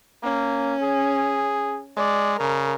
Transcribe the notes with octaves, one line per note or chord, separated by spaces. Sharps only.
A#3 C#4
G#4
G#3 D5
C#3 A#4